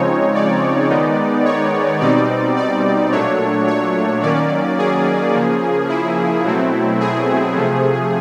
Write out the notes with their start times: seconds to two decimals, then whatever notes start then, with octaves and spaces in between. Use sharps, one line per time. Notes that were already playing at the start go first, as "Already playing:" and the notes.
Already playing: C#3 F3 G#3 C4 D#4 C#5
0.35 D5
0.90 D#3 G#3 B3 D#4
1.45 C#5
2.01 B2 G3 C4 D#4 D5
2.57 D5
3.12 A#2 F#3 A3 D4 C#5
3.67 C#5
4.23 D#3 F#3 A#3 C#4 D5
4.78 G#4
5.34 C#3 F3 A#3
5.89 E4
6.44 B2 F#3 A3 C4
7.00 G#4
7.56 C3 F3 A3